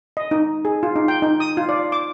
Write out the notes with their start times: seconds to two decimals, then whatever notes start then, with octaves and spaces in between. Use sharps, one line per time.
0.17 D#5
0.31 D#4
0.65 G#4
0.83 F4
0.96 D#4
1.08 G5
1.22 D#4
1.40 D#6
1.57 F4
1.69 D5
1.92 D6